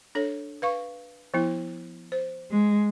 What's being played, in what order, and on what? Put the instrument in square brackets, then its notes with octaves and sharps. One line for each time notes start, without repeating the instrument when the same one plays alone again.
[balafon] D4 A4 C#5
B4 F5 C#6
F3 B3 E4
C5
[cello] G#3